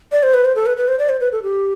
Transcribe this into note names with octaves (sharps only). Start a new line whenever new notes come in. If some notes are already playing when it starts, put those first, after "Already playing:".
D5
C5
B4
C5
A4
B4
B4
C5
D5
C5
B4
A4
G4